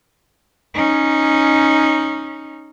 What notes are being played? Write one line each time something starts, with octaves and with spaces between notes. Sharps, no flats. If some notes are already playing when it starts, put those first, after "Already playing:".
C#4 D#4